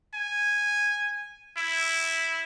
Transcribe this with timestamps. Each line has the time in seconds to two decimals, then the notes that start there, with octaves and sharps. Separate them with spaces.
0.14 G#5
1.57 E4